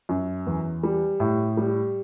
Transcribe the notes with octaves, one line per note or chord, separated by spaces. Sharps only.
F#2
E2
G3
A2
G3